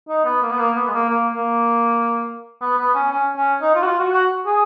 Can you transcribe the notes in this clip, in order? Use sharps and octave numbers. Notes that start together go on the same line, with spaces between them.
D#4
B3
A#3
B3
A#3
B3
G#3
A#3
A#3
A#3
B3
B3
C#4
C#4
C#4
D#4
F4
F#4
F4
F#4
F#4
G#4